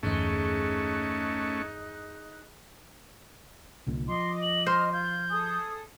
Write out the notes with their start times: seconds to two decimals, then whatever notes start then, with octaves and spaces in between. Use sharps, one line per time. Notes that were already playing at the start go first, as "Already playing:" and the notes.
0.03 G1 E2 G#3 A3 C#4 D#4 F#6
3.87 C2 A#2 D3
4.08 F3 D#5 C6 D6
4.42 F#7
4.66 C5 F6
4.93 F4 G6
5.30 G#4 A4 D#6